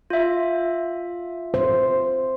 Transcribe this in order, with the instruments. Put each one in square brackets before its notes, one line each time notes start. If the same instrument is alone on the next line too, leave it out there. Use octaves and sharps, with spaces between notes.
[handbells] F4 E5
[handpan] C5